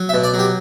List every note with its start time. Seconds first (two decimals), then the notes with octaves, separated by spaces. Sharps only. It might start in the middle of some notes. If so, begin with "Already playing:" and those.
Already playing: F#3
0.09 E5
0.14 B2
0.24 D5
0.34 F#3
0.39 G4